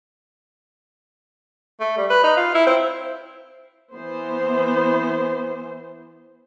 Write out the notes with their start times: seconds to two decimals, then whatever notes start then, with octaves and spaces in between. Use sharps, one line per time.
1.80 A3
1.97 G3
2.10 B4
2.24 D#4
2.37 F4
2.55 E4
2.66 C4
3.94 E3 B3 C5